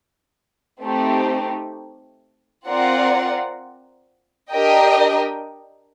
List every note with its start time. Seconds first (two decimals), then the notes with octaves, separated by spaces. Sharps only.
0.83 A3 C4 D#4 G4
2.67 C4 F4 A#4 D5 F#5
4.52 D4 G4 A#4 D#5 G5